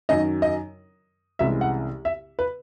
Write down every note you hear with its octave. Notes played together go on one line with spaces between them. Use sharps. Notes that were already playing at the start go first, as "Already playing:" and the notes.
F#2 D#3 F#3 D#5
D#5
C2 C3 E3 G#3 C#4 E5
F#5
E5
B4